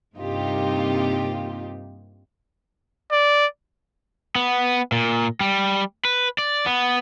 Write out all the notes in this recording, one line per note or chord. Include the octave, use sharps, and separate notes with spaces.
G2 C3 A#3 D#4 F4 G4
D5
B3
A#2
G3
B4
D5
B3